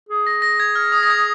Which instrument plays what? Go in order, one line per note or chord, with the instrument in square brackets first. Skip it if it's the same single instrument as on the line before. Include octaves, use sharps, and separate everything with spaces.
[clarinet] G#4
[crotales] A#6
A#6
G#6
F6
D#6
A#6
G#6